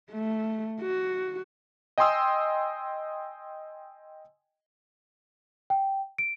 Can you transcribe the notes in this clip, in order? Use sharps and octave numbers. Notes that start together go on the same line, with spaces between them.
A3
F#4
D#5 G5 G#5 C6 D#6 E6
G5
D7